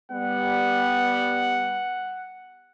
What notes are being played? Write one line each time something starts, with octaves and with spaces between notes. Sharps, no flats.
G3 B3 F#5